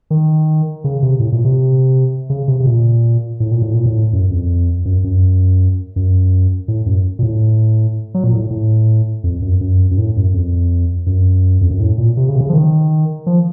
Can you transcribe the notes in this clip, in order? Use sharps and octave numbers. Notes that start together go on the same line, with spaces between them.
D#3
C#3
C3
A2
A#2
C3
C#3
C3
C3
A#2
A2
A#2
A2
A#2
A2
F#2
F2
F#2
F#2
F#2
A2
F#2
A#2
A2
F#3
A#2
A2
A2
F2
F#2
F#2
F#2
A2
F#2
F2
F#2
F2
F#2
A2
A#2
C3
C#3
C3
C#3
F3
D#3
F3